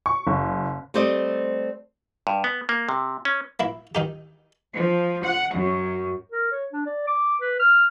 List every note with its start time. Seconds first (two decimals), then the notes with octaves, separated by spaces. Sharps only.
0.06 C#6
0.27 F#1
0.94 G3 A3 C4 C5 D5 D#5
2.27 G2
2.44 B3
2.69 A#3
2.89 C3
3.25 C#4
3.60 A#3 E4
3.95 D#3 D#4 G4
4.75 F3
5.23 F#5
5.55 F#2
6.32 A#4
6.52 C#5
6.73 D4
6.86 D5
7.07 D6
7.41 B4
7.60 F6